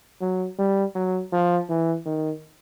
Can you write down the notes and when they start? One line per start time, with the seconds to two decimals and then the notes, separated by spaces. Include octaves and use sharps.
0.21 F#3
0.58 G3
0.95 F#3
1.32 F3
1.69 E3
2.06 D#3